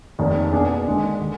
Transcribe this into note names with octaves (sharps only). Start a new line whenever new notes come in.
F1 D#2 D#3
B2 A#3 D4 G#4
D#2 D3 G#3 D4
D3